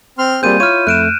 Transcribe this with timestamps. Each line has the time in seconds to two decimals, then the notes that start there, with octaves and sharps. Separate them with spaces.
0.19 C4 C6 F6
0.43 G3 A#3 C4 F4 G#4 G6 D#7
0.60 E4 F4 C#5 F6 D#7
0.87 F2 A3 F#6 D7 E7